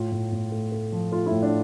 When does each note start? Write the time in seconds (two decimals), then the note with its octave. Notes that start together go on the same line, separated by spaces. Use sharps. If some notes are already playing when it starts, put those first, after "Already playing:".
Already playing: A2 F4
0.12 A2
0.32 A2
0.52 A3
0.72 A3
0.92 F3
1.12 A3 F4
1.26 E4
1.32 A2
1.42 D4